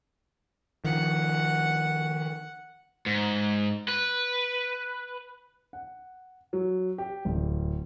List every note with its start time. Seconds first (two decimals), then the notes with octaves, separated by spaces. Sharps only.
0.84 D#3 F3 F#5
3.06 G#2
3.88 B4
5.73 F#5
6.53 F#3
6.98 G4
7.25 D1